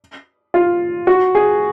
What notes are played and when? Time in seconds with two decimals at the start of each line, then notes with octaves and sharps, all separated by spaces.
0.54 F4
1.07 F#4
1.35 G#4